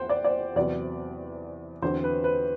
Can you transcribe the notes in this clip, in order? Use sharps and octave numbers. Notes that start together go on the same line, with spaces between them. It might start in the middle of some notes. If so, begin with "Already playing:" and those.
Already playing: E2 C3 C5 F#5 G5
D5
D5
E2 C3 F#3 B3 D5
E2 D3 F#3 C4 C5
B4
B4